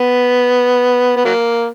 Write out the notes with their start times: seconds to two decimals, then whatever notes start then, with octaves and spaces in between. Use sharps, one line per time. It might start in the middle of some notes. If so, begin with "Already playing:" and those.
Already playing: B3
1.16 B3
1.25 F#3 A#3